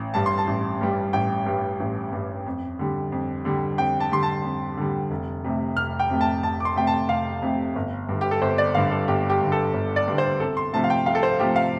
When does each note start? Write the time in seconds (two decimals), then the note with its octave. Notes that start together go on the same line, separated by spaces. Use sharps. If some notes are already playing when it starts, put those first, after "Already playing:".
Already playing: A1
0.14 G2 G3 A5
0.26 C6
0.38 A5
0.47 A1
0.81 G2 G3
1.13 A1 G5
1.46 G2 G3
1.80 A1
2.13 G2 G3
2.47 F2
2.79 D3 G3
3.12 F2
3.45 D3 G3
3.78 F2 G5
4.00 A5
4.11 D3 G3 C6
4.23 A5
4.45 F2
4.77 D3 G3
5.11 F1
5.44 F2 C3 A3
5.77 F1 F6
5.99 G5
6.10 F2 C3 A3
6.21 A5
6.43 F1 A5
6.60 D6
6.65 C6
6.76 F2 C3 A3 G5
6.87 A5
7.09 F1 F5
7.42 F2 C3 A3
7.76 G1
8.09 G2 D3
8.21 G4
8.31 A4
8.42 G1 C5
8.58 D5
8.74 G2 D3 F5
8.91 A4
9.08 G1 G4
9.30 G4
9.41 G2 D3
9.52 A4
9.74 G1
9.96 D5
10.08 G2 D3
10.18 C5
10.40 C2 A4
10.57 C6
10.73 C3 F3 A3 A5
10.84 F5
10.90 G5
11.06 C2 F5
11.15 A4
11.23 C5
11.40 C3 F3 A3 G4
11.56 F5